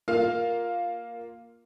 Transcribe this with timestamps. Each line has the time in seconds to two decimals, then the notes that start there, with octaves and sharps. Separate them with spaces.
0.08 A#3 F4 F5 F6